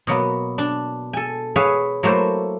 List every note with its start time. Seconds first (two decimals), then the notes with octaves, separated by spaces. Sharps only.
0.07 B2 F#3 A#3 B3
0.58 D4
1.13 A4 G#5
1.56 G#4 B4 C#5 E5 F5
2.03 F#3 A3 A#3 E4 C5